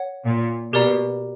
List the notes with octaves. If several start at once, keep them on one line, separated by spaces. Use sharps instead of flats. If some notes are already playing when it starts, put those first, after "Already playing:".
Already playing: C#5 F#5
A#2
B2 G4 A#4 D5 A#5